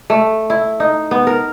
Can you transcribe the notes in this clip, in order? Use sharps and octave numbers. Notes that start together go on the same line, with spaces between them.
A3
E4
D#4
B3
A#4